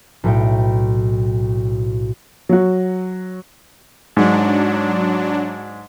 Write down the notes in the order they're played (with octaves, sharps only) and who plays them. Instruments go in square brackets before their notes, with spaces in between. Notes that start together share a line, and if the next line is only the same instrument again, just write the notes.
[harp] B1 A2 C#5 G5
[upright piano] F#3 F#4
[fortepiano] G#2 [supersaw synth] F#3 D4